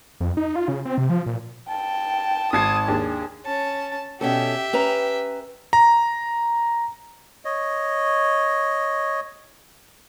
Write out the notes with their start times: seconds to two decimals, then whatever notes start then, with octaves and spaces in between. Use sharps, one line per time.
0.20 F2
0.37 D#4
0.56 F4
0.68 C#3
0.85 C4
0.98 C3
1.10 F3
1.26 A#2
1.69 G5 A5
2.53 G#1 A5 D#6 G#6 C7
2.88 D#2 D4 G#4
3.45 C#4 A5
4.21 B2 C#4 G4 A4 E5
4.73 C#4 B4 A#5
5.73 A#5
7.45 C#5 D#5